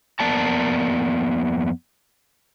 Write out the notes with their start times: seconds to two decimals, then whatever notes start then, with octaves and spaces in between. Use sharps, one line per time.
0.20 F2 A#3 B3 D5 A5 A#5